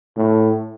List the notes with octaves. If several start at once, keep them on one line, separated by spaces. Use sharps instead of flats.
A2